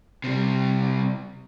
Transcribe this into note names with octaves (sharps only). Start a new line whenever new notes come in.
C3 G3